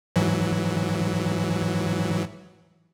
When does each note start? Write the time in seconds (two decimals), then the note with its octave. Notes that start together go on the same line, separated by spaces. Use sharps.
0.16 G#2 E3 F#3